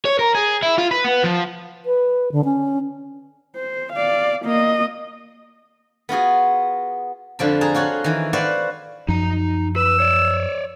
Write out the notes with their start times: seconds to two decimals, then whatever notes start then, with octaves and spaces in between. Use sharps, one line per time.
0.05 C#5
0.19 A#4
0.35 G#4
0.63 E4
0.78 F4
0.91 B4
1.04 B3
1.24 F3
1.86 B4
2.32 D3
2.45 C#4
3.56 C5
3.93 D5 F5
4.45 A#3 D#5
6.09 B3 F4 F#4 G#4
7.39 F2 D3 F3 B5
7.61 G#4 A5 A#5
7.74 F4 F#4 C#5 F#5
8.04 D#3 E3
8.33 F#4 B4 C5 D5 F5 F#5
9.09 F#2 F3 D#4 A#5
9.76 B4 E6
10.00 C#5 D5